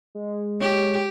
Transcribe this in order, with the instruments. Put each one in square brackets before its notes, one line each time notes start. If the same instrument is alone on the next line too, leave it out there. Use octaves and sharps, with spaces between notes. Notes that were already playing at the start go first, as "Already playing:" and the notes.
[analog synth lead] G#3
[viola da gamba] G4 [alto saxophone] C#5